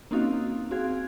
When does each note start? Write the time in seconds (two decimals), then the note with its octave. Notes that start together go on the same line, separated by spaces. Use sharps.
0.11 A#3 C4 C#4 D#4 F#4 F5
0.71 C4 F#4 G#4 F5 G#6